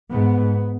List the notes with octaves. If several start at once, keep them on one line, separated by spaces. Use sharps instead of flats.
G#2 B3